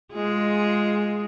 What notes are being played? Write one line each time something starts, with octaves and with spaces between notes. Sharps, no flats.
G#3 F4 G#4